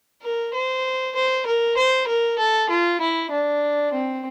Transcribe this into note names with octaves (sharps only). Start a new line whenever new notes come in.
A#4
C5
C5
A#4
C5
A#4
A4
F4
E4
D4
C4